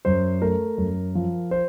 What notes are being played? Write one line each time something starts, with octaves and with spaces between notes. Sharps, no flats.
F#2 C5
A3 A#4
F#2
F3
C5